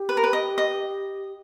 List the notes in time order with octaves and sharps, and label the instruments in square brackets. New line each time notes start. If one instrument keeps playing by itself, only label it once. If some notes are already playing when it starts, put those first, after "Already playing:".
Already playing: [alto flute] G4
[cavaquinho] B4
A#4
B4
D#5
D#5